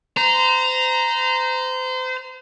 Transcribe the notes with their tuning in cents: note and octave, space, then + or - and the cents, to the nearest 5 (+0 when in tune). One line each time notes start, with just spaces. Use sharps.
C5 -30 A#5 +0